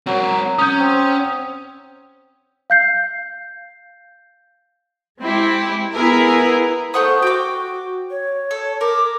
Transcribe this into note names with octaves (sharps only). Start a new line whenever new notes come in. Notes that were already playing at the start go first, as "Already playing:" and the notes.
F#3 C4 A#4
C#4 D#6 G6
C4
F5 G6 C7
G#3 C4 E4 G4
B3 E4 G#4 A#4
A3 C5 F#5 D#6
F#4 G5 D6
C#5
A4
A#4 D6